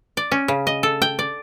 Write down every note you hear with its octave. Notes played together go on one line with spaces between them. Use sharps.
D5
C#4
C#3
D#5
A4
G5
D5